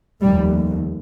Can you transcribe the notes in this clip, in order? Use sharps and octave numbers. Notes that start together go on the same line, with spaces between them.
F1 D#2 G3